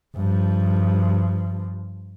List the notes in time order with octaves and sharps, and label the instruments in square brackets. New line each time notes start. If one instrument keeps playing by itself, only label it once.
[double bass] G2 F3